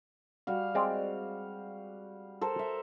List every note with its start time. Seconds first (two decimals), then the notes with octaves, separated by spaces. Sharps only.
0.47 G3 F#4 F5
0.75 G#3 C4 D5
2.41 A4 A#4 C5
2.59 E5